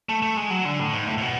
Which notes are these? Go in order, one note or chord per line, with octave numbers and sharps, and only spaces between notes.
A3
A3
G#3
F#3
D3
A2
G#2
A2
A2
B2